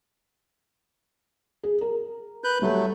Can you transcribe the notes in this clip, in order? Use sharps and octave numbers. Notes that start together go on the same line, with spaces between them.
G#4
A#4
B4 F#6 G6
F#3 G3 A3 A4